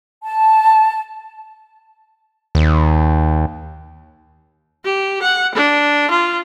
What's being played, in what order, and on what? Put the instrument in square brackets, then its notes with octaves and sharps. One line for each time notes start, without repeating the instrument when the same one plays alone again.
[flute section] A5
[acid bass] D#2
[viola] G4
F#5
D4
F4